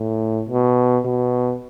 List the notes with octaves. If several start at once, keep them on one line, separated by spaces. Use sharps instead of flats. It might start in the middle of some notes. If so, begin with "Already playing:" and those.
Already playing: A2
B2
B2